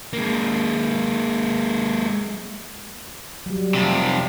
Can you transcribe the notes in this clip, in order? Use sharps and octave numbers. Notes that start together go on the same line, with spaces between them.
G#3 A#3
F#3 G3
F2 C3